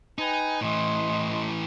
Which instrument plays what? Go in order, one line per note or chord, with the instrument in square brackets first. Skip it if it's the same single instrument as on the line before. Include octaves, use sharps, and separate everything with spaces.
[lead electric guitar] D#4 [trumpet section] B4 G5 G#5
[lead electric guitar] A2 E3 [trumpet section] D#5 C6